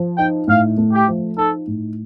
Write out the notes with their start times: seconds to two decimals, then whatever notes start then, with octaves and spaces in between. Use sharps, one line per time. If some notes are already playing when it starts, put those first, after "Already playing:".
Already playing: F3
0.18 D#4 G5
0.48 A2 F5
0.78 A3
0.92 G4
1.08 F3
1.37 D#4 A4
1.67 A2